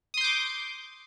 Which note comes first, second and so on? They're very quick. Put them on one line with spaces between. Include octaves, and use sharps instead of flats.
D#6 C6 G6 D6